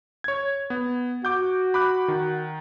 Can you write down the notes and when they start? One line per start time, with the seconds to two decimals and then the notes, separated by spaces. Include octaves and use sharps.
0.24 C#5 G#6
0.70 B3
1.25 F#4 D6 G6
1.74 B5 D6 F#6
2.08 D#3